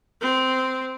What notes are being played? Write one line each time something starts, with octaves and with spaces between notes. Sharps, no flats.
C4